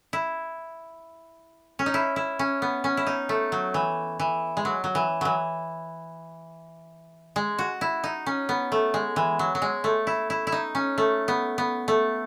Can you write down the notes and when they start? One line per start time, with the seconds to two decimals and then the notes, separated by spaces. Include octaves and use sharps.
0.13 E4
1.79 C#4
1.86 D#4
1.94 E4
2.16 E4
2.39 C#4
2.62 B3
2.84 C#4
2.97 E4
3.07 D#4
3.29 A3
3.52 F#3
3.74 E3
4.20 E3
4.57 G#3
4.65 F#3
4.84 F#3
4.95 E3
5.21 E3 F#3
7.36 G#3
7.59 F#4
7.81 E4
8.04 D#4
8.26 C#4
8.49 B3
8.72 A3
8.94 G#3
9.16 E3
9.39 F#3
9.55 F#3
9.62 G#3
9.84 A3
10.07 E4
10.30 E4
10.47 E4
10.52 D#4
10.75 C#4
10.98 A3
11.28 B3
11.58 B3
11.88 A3